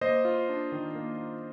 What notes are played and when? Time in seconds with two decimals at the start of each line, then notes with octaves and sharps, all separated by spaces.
0.01 A#3 C5 D#5
0.25 F4
0.49 D4
0.72 D#3
0.95 A#3
1.18 F4